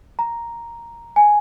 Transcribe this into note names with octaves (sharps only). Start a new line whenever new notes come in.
A#5
G#5